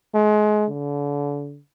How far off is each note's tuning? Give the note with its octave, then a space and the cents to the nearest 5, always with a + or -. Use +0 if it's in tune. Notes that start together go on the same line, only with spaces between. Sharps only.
G#3 +30
D3 -35